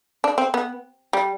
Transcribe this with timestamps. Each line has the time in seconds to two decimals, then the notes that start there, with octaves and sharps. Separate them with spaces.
0.24 D4
0.38 C4
0.54 B3
1.13 G3